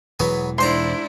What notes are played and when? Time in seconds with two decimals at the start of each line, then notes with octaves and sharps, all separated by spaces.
0.20 E1 E3 F#3 B3 G#4
0.58 G#2 D4 E4 C5 A#5 C6